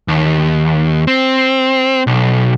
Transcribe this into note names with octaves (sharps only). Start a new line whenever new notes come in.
D#2
C4
B1